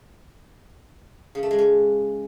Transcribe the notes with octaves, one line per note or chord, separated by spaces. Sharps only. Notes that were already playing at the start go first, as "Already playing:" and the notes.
C#3
A3
G#3
C#4